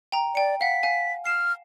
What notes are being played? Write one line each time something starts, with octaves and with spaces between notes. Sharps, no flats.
G5 A#5
D5 G5 C#7
F5 F#5 B6
F5 G#5
F6 C7 E7